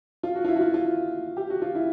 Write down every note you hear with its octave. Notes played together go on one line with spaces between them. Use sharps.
F4
F#4
F4
E4
F#4
F4
F4
G4
F#4
F4
E4